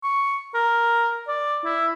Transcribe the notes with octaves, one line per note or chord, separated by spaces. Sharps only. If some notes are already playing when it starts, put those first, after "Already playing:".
C#6
A#4
D5
E4